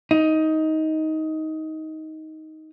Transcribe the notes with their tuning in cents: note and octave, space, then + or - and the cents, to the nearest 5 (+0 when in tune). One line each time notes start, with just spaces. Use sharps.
D#4 +15